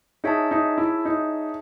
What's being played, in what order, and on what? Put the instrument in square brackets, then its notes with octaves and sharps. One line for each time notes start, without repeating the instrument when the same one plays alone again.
[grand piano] D#4 [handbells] G#4 C#5 E5 A5
[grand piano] D#4
E4
D#4